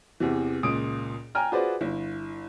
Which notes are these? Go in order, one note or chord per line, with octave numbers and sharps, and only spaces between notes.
E2 C3 E3
C#2 A#2 D#6 D7
G5 G#5 A#5 F6
F4 F#4 G#4 B4 C5 D5
G1 E4